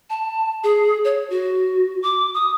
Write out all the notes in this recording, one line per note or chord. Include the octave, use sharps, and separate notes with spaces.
A5
G#4
C#5
F#4
D6
D#6